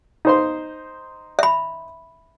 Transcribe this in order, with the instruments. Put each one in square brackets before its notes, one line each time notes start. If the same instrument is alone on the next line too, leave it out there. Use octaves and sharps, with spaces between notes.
[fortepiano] D#4 C5 C6
[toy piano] E5 B5